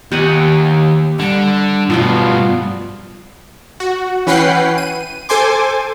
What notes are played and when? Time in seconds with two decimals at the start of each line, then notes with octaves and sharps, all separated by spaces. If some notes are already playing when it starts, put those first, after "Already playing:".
0.12 D#2 G4 F#5 G#5
1.20 D3 G3
1.90 G2 B2 F3 G3 B3 F4
3.80 F#4
4.27 E3 C#4 B4 F#5 G5 C7
4.78 D#7
5.29 A4 C5 G#5 C6 D6